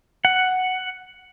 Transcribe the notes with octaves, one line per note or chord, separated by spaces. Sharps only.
F#5